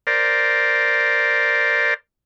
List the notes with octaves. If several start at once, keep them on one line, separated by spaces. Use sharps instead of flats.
A#4 C5 D5